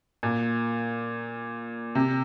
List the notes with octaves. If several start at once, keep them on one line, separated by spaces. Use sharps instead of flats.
A#2
C3